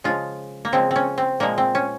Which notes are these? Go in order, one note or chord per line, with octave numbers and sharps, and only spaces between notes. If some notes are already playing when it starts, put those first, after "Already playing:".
C#3 F3 G#3 F4
A#3
C#3 F3 G#3 C4
C4 C#4
C4
A#2 F3 G#3 A#3
C4
C#4